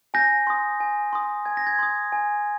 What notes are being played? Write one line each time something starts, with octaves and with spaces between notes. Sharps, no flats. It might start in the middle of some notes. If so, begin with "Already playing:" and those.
G#5 G6 A#6
C6 D#6
G#5
C6 D#6
G#5 G#6
A#6
G#6
C6 D#6
G#5